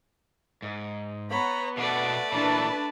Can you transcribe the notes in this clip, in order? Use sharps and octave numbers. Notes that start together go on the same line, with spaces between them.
G#2
B3 C#5 A#5 B5
B2 A3 D4 B4 D5 F#5
A#2 E3 D4 B4 A5 B5